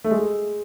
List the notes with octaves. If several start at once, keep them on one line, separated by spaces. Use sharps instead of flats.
A3
G#3